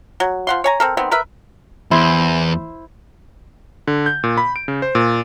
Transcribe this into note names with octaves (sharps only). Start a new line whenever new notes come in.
F#3
F3 F#5 C6
C#5 G#5 A#5
C4 A4 A#4
D#3 B3 C4
A#4 B4 E5
E2 E4 C5
D3
G6
A#2
B5
D7
C#3
C5
A#2